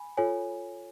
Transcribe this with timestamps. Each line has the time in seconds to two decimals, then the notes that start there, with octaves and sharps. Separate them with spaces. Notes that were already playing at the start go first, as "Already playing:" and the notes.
Already playing: G#5 B5
0.17 F4 A4 C#5 G#5